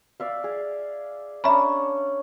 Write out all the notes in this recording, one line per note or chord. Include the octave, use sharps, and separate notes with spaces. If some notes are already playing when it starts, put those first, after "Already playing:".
D5 E5 F5
G#4
C#4 D4 E5 A#5 B5